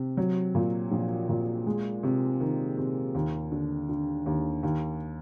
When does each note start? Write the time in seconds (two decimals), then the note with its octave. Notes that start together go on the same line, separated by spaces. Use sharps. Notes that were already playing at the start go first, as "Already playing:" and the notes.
Already playing: C3
0.17 F#3
0.55 A#2
0.91 A#1
1.29 A#2
1.66 G#3
2.03 C3
2.40 D#3
2.77 C3
3.15 D#2
3.52 D3
3.89 D3
4.26 D#2
4.63 D#2